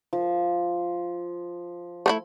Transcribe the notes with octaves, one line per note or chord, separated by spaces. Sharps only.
F3
A3 C4 E4